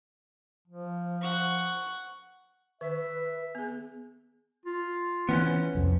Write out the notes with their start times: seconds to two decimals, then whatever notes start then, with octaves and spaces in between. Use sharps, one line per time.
0.68 F3
1.21 F#5 C#6
2.81 D#3 B4 E5
3.55 B3 G#4
4.66 F4
5.29 E3 B3 C#4 C5
5.75 C2 F2